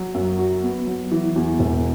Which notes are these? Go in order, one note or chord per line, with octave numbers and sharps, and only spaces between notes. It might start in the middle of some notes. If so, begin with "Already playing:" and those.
Already playing: F#3
F#2
F#4
B3
F#3
E3
E2
E1